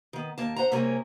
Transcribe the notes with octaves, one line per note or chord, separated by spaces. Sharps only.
D#3 B3
D#2 A#3 A5
C5 F#5 A#5
C3 G3 A#3 C#4 G#4 A#4